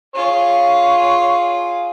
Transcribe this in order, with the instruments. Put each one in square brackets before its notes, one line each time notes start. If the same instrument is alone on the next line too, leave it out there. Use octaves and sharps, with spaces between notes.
[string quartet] F4 G#4 [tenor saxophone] C#5